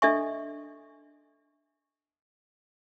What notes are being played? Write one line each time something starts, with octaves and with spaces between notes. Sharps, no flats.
D4 A4 D#5 E5 G#5 C#6